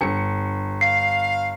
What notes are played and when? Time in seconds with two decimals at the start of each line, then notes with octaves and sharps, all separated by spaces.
0.01 G1 C#7
0.81 F5 C7